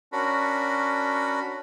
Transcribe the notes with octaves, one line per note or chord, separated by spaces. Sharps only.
C#4 D4 F#4 A#4 B5